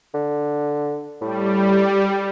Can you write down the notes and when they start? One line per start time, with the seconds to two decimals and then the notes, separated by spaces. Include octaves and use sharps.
0.14 D3
1.21 A2 G3